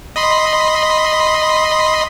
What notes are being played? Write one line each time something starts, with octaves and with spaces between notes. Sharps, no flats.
D#5 B5 C6